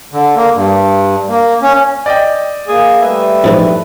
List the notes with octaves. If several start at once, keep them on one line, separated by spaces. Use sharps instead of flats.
D3
A#3
G2
A#3
C#4
D5 D#5 G5
A#3 G#4
G3 A3 B4 E5
F2 G#2 E3